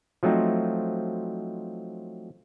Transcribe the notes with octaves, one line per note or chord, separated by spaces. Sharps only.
F3 F#3 A3 C4 D#4